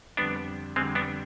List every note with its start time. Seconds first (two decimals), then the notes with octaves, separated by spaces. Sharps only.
0.17 F2 D3 G3 B3 D4
0.76 F2 D3 G3 G#3 C4
0.95 B3 D4